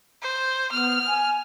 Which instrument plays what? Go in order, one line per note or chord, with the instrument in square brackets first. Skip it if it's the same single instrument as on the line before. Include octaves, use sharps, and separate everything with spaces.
[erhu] C5
[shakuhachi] B3 [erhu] F6
[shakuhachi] G#5